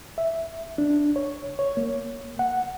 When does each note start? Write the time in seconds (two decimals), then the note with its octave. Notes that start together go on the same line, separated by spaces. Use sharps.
0.18 E5
0.78 D4
1.16 C#5
1.59 C#5
1.77 A#3
2.39 F#5